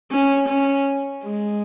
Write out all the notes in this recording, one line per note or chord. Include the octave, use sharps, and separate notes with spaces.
C#4
C#4
G#3